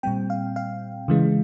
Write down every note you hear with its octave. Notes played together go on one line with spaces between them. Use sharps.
A#2 G3 C4 G5
F5
F5
C#3 E3 G#3